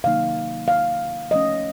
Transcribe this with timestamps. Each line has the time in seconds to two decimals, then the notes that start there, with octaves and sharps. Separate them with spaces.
0.04 C3 D#3 F#3 A#3 D#4 F5
0.68 F5
1.31 F3 A3 C#4 D#5